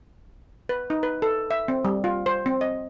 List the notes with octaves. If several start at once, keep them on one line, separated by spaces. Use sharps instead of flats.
B4
D#4
B4
A4
E5
C4
G3
F4
C5
C4
D#5